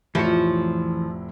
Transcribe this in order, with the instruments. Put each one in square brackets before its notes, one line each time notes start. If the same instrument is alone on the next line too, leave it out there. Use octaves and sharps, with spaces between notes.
[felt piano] F1 A2 E4 [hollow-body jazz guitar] E3 F#4 C#5 [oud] F3